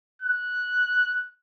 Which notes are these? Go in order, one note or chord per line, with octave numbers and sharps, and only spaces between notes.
F#6